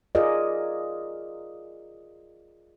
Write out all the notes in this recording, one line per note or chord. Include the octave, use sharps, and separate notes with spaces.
F4 G#4 A#4 D5 D#5